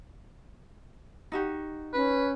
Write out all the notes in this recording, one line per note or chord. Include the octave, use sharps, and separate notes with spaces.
D#4 F#4 G4
C#4 B4